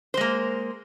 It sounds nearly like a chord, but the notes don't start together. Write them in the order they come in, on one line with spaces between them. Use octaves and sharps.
C5 G#3 A#3